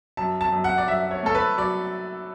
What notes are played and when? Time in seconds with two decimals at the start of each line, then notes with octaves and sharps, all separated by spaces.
0.17 F#2 A5
0.41 A5
0.52 F#2
0.64 F#5
0.78 D5
0.88 F#2 E5
1.11 C#5
1.23 A3 A4
1.35 B4
1.58 F#3 D5